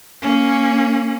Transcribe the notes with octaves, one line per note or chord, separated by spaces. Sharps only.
A#3 C#4